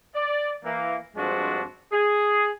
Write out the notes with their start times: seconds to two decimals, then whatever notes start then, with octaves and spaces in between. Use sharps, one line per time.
0.15 D5
0.65 E3 A#3
1.16 G2 F3 G#3 C4 D4 F#4
1.92 G#4